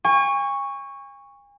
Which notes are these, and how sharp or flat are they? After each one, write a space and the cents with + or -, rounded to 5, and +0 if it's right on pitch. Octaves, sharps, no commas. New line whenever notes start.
G#5 -40 C#6 +0